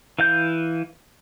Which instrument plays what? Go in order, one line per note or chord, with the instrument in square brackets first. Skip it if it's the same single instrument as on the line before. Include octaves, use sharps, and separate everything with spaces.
[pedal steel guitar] E3 F5 G6